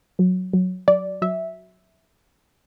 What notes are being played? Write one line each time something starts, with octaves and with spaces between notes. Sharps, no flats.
F#3
F#3
F#3 D5
F#3 E5